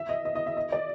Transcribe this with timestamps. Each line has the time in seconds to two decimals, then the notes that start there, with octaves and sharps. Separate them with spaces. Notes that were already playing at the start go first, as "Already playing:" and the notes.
Already playing: E5
0.09 D#5
0.25 D#5
0.35 D#5
0.46 E5
0.57 D#5
0.72 D5